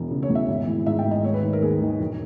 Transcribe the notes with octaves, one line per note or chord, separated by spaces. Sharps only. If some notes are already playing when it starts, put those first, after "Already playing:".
Already playing: E1 E2
C#3
C#5
E2
E5
G#1
E3
G#2 E5
G5
G#1
D#5
D#2 C#5
B4
D#3
A#4
D#2 G#4
D#3
E1